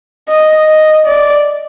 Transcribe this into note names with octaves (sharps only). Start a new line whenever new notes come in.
D#5
D#5
D5